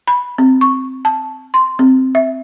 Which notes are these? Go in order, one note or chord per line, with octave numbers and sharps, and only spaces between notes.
B5
C4
C#6
A5
C6
C4
E5